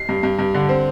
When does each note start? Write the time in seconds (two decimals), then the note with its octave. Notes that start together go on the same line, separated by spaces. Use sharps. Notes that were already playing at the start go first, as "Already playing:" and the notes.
Already playing: C7
0.09 G2
0.23 G2
0.39 G2
0.54 D3
0.69 C4